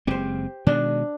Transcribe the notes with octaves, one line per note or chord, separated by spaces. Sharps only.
F#1 G#3 C4 G4 C5
B2 D#3 G#3 D4